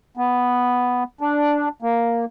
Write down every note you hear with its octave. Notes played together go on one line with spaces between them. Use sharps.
B3
D4
A#3